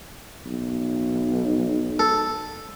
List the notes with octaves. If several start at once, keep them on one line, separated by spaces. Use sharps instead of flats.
B1
A4